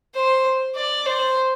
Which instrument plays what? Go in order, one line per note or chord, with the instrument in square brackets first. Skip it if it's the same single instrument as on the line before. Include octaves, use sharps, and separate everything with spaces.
[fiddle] C5
D5
C5